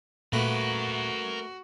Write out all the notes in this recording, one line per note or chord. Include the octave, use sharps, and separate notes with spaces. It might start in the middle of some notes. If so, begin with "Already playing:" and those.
A#2 A3 A#3 F#4 A#4 B4 F#5